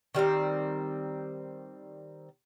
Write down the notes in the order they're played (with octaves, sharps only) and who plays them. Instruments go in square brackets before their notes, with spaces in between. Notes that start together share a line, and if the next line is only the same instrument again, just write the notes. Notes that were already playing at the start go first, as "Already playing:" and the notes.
[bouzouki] D#3 G3 A3 C4